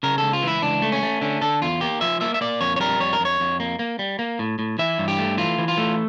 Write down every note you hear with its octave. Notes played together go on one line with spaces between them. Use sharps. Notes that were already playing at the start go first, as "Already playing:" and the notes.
C#3 A#4
C#2 A4
F4
E3 E4
C#2 D4
A3
C#4
A3
D3 C#4
D3 A4
E2 F4
A#3 G4
F3 E5
A#3 E5
E5
A#3 D5
F2 C#5
C#5
G3 A#4
F2 C#5
A#4
F2
C#5
F2
A#3
A#3
G3
A#3
A2
A2
E3 E5
G2
G4
A3
E3 F4
E3
F4
A3